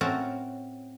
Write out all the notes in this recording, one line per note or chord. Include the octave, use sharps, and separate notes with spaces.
A2 C4 C#4 F#4 A#4 A5